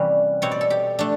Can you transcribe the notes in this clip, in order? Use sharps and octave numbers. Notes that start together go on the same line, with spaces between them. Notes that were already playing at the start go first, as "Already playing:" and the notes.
Already playing: C3 E3 G3 A#3 C#4 B4
B2 G3 C4 C#5
D5
A4
G4
A3 D4